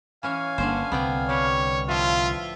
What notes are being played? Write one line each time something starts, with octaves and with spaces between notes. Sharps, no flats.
E3 C#4 C#5 F5 G#5
G1 D3 A#3 C#4 C5
C2 D3 B3 C4 D5 G5
G3 G4 C#5
A2 F3 F4 E5